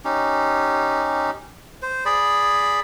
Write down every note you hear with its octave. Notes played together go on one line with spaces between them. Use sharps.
C#4 D#4 G4
C5
G#4 D5 B5